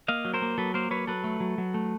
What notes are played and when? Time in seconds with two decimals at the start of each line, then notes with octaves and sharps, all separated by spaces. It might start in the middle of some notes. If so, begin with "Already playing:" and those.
0.08 A#3 D#5 F5
0.25 F#3
0.34 A#4 C5
0.42 A#3
0.58 F#3 A4 B4
0.74 A#3 A#4 C5
0.91 F#3 B4 C#5
1.07 F#3 A4 B4
1.24 A3
1.40 F#3
1.58 F#3
1.74 A3